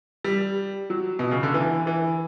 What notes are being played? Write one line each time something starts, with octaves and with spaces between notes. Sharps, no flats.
G3
F#3
B2
C#3
D3
E3
E3